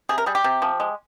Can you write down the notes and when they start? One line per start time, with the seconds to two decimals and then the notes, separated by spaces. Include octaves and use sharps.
0.09 C3 G#4
0.18 A#4
0.26 G3 G#4
0.35 G4
0.44 C3
0.62 F3
0.80 G#3